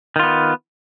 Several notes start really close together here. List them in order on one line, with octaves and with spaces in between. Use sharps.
D#3 F4 B3